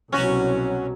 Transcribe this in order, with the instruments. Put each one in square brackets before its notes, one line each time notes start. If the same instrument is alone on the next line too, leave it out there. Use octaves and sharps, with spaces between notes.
[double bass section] C2 B2 F#3 [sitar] C#4 F#4